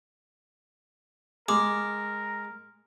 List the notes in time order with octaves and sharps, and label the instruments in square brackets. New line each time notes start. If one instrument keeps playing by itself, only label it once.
[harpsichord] G#3 [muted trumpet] A#4 [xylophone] D6